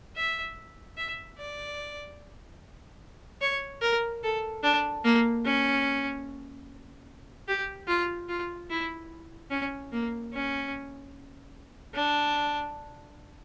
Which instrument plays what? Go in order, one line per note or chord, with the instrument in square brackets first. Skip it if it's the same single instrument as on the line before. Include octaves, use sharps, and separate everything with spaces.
[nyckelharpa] E5
E5
D5
C#5
A#4
A4
D4
A#3
C#4
G4
F4
F4
E4
C#4
A#3
C#4
D4